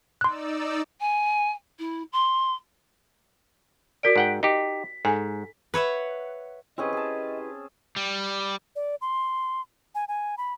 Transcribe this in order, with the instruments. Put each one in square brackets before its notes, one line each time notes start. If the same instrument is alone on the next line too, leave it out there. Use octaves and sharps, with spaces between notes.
[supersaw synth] D#4 D5 E6 [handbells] C6 F#6
[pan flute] G#5
E4
C6
[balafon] F#4 A#4 D5 [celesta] B6 D7
[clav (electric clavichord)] G#2 F#5 G5
[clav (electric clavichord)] D#4 G4 [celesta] B6
[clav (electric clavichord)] G#2 [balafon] A4 G#5
[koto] B4 C#5 E5 F#5
[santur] C4 C#4 G#4 [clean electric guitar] E4 G4 B4 [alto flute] D#5
[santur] G#4 A5
[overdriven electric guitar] G3
[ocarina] D5
C6
G#5
G#5
B5